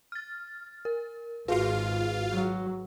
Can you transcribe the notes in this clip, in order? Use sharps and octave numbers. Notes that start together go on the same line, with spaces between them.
F6 A6
A#4
G#1 F4 F#4 G#4 B4 F5
F#3